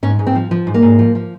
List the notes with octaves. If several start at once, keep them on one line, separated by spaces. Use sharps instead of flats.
G#2 C#4
G#2
C4
F3
F3
G#2
A#3
G#2
F3
F3